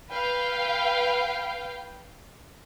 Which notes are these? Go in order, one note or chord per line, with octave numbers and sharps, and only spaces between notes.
B4 F5 G5